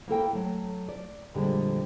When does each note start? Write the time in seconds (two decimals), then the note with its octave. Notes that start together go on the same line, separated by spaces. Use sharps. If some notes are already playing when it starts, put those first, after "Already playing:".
0.08 A#3 E4 A4 G5
0.33 F#3 A3
0.89 D5
1.34 F2 A#2 D3 G3 G#3